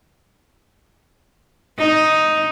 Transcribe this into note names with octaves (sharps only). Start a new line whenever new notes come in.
D#4